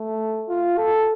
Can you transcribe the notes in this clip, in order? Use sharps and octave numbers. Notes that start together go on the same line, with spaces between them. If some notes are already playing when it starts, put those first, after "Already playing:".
Already playing: A3
F4
A4